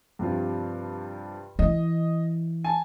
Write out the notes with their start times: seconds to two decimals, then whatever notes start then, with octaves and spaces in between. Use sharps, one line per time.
0.19 G2 C3 F3
1.59 E3 D#5
2.64 G#5 A5